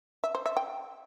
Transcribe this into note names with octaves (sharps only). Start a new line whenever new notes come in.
E5
C5
E5
G5